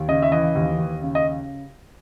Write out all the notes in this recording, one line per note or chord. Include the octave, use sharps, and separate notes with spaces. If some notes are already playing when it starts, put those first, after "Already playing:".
Already playing: D#2
C#3 D#5
E5
E3 D#5
D#2
D#2
C#3
D#5